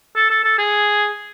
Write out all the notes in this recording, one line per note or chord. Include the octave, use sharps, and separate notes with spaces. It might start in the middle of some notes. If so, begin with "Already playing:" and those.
A4
A4
A4
G#4